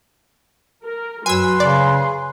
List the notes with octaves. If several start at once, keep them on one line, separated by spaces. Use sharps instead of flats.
A#4
F#2 F#3 B4 G#5 C6 E6
C#3 G#4 D5